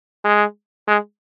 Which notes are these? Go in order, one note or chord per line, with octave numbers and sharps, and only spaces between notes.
G#3
G#3